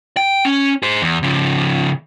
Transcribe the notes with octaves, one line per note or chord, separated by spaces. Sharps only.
G5
C#4
G#4 C5
E2
C#3 F3